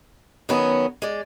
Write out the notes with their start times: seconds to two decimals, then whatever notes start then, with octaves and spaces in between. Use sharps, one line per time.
0.49 D#3 F#3 B3 C#4
1.02 G#3 D5